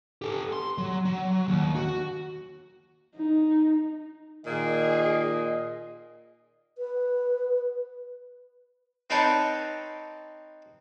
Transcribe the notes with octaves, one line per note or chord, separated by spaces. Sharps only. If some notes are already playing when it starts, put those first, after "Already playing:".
G4 A4
C6
F#3
F#3
D#2
F#4
D#4
A#2 D#3 G#4 D#5
B4
C4 D#4 B4 C#5 G5 A5